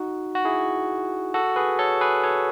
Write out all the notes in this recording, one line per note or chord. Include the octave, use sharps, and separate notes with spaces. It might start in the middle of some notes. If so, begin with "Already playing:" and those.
Already playing: D#4 F#4
F#4
E4 G#4
F#4 A4
G#4 B4
A4 C#5
G#4 B4
A4 C#5